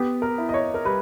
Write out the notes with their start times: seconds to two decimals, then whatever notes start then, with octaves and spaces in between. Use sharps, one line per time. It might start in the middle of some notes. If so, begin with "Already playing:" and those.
Already playing: B3 G4
0.22 A#4
0.38 E4
0.49 D#5
0.54 C#5
0.74 A#4
0.85 G3 B4